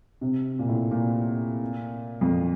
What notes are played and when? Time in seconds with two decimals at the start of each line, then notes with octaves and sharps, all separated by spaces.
0.21 C3
0.59 A#2
0.68 A2
0.91 A#2
2.21 F2